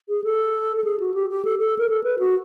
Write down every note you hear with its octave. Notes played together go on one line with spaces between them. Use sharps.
G#4
A4
A4
G#4
F#4
G4
G4
A4
A4
A#4
A4
B4
F#4